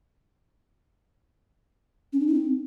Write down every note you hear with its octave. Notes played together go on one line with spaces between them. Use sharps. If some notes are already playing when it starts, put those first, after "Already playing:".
C#4
D4
D#4
C4